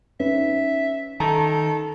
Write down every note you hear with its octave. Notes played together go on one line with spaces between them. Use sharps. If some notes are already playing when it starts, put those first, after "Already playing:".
C#4 D#4 B4 E5
D#3 A4 A5 A#5